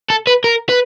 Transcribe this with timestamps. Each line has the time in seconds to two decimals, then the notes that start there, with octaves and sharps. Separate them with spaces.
0.10 A4
0.27 B4
0.44 A#4
0.69 B4